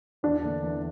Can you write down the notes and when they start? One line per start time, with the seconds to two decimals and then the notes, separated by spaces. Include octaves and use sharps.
0.23 E2 D4
0.43 D3 A#3
0.63 E2